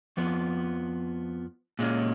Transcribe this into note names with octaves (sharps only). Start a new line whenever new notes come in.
F2 F3 B3
A#2 G#3 C#4